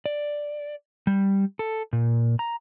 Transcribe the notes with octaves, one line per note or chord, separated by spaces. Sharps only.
D5
G3
A4
A#2
A#5